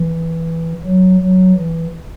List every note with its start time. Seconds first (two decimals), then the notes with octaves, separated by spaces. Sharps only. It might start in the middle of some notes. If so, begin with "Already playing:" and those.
Already playing: E3
0.85 F#3
1.21 F#3
1.56 E3